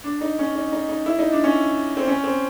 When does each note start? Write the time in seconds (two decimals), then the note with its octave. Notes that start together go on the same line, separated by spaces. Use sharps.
0.04 D4
0.21 D#4
0.39 C#4
0.55 D#4
0.72 D#4
0.89 D#4
1.06 E4
1.19 D#4
1.32 D4
1.44 C#4
1.97 C4
2.07 C#4
2.24 C4